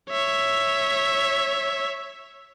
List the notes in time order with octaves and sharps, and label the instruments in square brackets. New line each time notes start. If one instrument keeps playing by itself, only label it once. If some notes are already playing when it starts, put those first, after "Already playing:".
[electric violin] C#5 E5